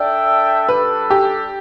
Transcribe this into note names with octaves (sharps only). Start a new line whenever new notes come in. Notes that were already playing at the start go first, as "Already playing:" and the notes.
Already playing: D4 A4 D5 E5 G5
G3 D4 A4 B4
G4